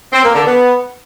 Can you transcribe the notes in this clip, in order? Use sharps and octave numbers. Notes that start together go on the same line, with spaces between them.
C4
A#3
D3
B3